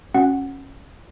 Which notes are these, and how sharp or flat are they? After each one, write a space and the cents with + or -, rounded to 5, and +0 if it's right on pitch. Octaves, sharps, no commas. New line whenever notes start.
C#4 -15 F#4 -20 F#5 +0